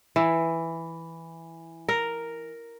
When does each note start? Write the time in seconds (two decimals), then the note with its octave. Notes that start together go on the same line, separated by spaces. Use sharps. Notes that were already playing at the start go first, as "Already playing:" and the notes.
0.16 E3
1.88 A#4